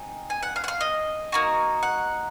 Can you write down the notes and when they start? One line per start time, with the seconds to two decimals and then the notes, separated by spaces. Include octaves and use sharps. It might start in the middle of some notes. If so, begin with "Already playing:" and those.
Already playing: C4 D#4 G#4
0.30 G#5
0.43 F#5
0.56 F5
0.64 F#5
0.68 F5
0.81 D#5
1.32 A#3 D#4 F#4
1.83 F#5